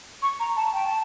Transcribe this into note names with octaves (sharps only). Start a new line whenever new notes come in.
C#6
A#5
A5
G5
A5